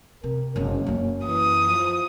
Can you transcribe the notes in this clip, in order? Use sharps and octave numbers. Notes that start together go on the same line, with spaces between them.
C3 A#4
F#1 G#3 C#4
F#2 A#3
E3 D#6
F3